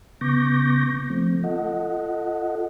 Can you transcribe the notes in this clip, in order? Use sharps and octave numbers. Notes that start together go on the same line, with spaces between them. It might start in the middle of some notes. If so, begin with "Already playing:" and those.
C#3 B3 C#6 D6 G6 A#6
F3 A3 C4
F4 A4 D#5 F#5